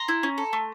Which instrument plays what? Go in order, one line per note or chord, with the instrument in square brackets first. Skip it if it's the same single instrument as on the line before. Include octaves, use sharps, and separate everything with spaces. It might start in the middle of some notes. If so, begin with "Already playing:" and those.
Already playing: [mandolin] A#5 C6
E4
C#4
A4
A3